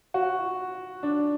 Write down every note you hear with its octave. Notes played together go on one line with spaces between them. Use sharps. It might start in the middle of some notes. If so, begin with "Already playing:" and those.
F#4
D4